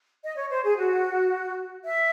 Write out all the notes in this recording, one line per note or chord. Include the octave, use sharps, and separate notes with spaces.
D#5
C#5
C5
G#4
F#4
E5